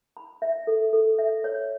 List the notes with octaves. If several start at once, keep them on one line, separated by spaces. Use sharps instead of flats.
B5
E5
A4
A4
E5
C#5